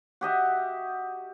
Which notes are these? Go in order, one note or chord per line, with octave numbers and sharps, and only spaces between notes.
F#4 G4 D#5 E5